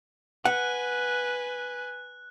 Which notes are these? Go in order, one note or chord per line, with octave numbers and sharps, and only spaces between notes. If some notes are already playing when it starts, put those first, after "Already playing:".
B4 F#5 G#5 F#6